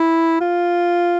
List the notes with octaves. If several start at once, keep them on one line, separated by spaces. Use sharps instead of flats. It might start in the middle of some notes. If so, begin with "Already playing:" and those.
Already playing: E4
F4